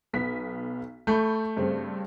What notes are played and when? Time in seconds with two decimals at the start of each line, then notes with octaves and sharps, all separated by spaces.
0.13 B1 B3 B6
1.07 A3 B5 C#6 G6
1.57 G2 C#3 C4